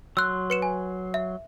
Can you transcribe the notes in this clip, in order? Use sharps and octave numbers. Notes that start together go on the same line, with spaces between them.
F#3 C6 E6 F#6
B4 C#7 E7
G#5
E5